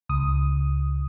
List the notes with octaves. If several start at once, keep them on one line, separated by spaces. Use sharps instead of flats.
C#2 D#6